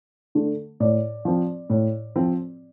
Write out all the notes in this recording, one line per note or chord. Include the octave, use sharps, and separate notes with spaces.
D3 A3
A2 D5
F3 C4
A2
F3 C4